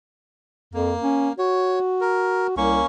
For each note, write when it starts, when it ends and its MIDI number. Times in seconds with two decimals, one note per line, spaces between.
0.74 0.93 41
0.74 1.33 58
1.03 1.30 61
1.38 2.57 66
1.38 1.79 73
2.01 2.47 70
2.57 2.79 36
2.57 2.86 58
2.57 2.86 61
2.57 2.86 85